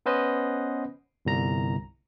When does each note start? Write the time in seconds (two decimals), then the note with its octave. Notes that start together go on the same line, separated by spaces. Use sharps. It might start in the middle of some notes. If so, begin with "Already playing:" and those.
0.06 B3 C#4 B4 C5 D#5
1.25 G1 C2 A#5